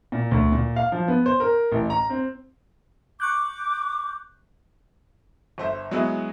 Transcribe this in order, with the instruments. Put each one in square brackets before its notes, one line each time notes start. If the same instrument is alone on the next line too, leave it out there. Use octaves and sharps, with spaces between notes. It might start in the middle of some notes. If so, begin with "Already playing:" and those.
[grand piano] A#2
D2
A#2
F5
F3
B3
C5
A#4
A1
A#5
C4
[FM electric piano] C#6 F#6 G6 [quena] D6
[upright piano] G1 C5 E5
F#3 G#3 B3 E4